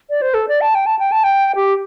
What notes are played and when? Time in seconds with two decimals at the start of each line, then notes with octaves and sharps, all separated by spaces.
0.10 D5
0.22 C5
0.34 A4
0.48 D5
0.61 A5
0.75 G5
0.86 A5
0.99 G5
1.12 A5
1.24 G5
1.56 G4